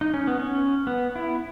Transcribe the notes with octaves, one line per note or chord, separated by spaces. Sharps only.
D#4
C#4
B3
C#4
B3
E4